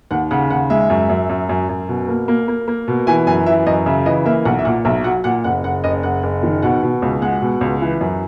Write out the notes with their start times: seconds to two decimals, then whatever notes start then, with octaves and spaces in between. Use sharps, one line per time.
0.11 D#2 F#5
0.31 C#3 F#5
0.50 D#2 F#5
0.70 G#3 E5
0.90 F#2
1.09 F#2
1.29 F#2
1.49 F#2
1.69 F#2
1.89 B2
2.08 A#3
2.28 A#3
2.48 A#3
2.68 A#3
2.88 B2
3.07 E3 G#5
3.27 F#2 G#5
3.46 E3 E5
3.66 F#2 D#5
3.86 C#3 E5
4.06 E3 D#5
4.26 A#3 E5
4.45 B1 F#5
4.59 E5
4.65 A#2 F#5
4.85 B1 E5
5.04 F#3 F#5
5.24 A#2 F#5
5.44 F#1 F#5
5.64 F#1 F#5
5.84 F#1 D#5
6.03 F#1 F#5
6.23 F#1
6.43 D#3
6.62 B2 F#5
6.83 B2
7.02 C#2
7.22 G#3 F#5
7.42 B2
7.61 C#2
7.81 E3
8.01 F#2